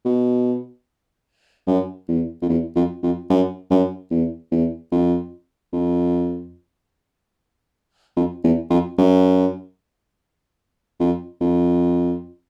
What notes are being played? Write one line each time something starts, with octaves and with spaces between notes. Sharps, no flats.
B2
F#2
E2
F2
E2
F2
F2
F#2
F#2
E2
E2
F2
F2
F2
E2
F2
F#2
F2
F2